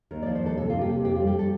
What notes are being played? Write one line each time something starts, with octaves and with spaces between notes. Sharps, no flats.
D#2 A#4
F3 D5
C5
D#2 A4
C3 A4
A#3 F4
G4
C3
F2 G4
G3 F4
G4
A4